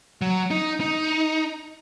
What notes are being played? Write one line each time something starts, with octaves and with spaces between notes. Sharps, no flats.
F#3
D#4
D#4